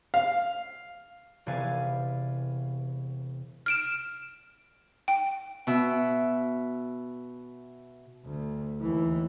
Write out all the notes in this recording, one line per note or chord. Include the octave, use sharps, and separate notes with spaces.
F5
E1 C3 B3 D5 F5 G#5
F6 D7 E7
G5
B2 E5
D2
D#2 E3